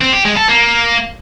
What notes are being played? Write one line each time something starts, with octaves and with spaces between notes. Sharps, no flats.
C4
G4
G#3
A4
A#3